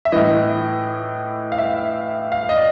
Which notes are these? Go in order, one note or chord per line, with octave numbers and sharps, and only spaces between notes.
E5
A2 E3 D#5
F5
E5
F5
D#5
D5